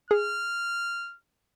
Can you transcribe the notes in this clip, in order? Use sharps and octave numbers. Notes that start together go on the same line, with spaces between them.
G#4 F6